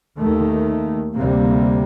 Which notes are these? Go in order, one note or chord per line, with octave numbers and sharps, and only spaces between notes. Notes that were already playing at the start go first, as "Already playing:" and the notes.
D#2 D#3 A3
D2 C3 G3 A#3